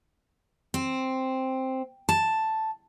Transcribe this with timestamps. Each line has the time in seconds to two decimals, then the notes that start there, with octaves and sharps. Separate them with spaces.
0.74 C4
2.09 A5